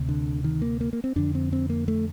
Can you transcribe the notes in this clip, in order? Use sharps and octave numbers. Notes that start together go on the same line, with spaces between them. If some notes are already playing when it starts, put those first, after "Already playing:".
Already playing: D2 C3
D3
D#3
A#3
A#3
A#3
C4
F2 D3 D4
C4
C4
A#3
A3